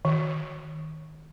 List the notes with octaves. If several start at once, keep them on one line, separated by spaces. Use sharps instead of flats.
D#3